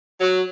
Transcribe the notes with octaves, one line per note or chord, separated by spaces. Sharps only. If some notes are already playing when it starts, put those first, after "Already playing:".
F#3